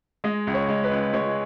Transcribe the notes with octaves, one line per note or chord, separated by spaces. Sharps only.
G#3 D#5
C#2
C#5
G#3
B4
C#2
G#3 C#5